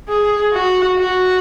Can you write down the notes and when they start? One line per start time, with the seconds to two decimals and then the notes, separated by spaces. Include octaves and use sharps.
0.09 G#4
0.53 F#4
0.99 F#4